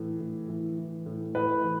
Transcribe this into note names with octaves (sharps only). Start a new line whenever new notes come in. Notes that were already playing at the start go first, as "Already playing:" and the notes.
Already playing: A2 E3
A2
E3
E3
A2
A2 B4
E3